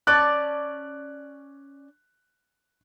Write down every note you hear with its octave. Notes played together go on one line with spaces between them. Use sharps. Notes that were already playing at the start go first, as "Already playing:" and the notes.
C#4 D5 A5 F#6